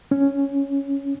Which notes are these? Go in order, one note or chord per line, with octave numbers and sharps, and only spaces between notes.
C#4